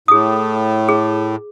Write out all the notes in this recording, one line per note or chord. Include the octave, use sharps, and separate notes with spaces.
A2 G#4 D#6
G#4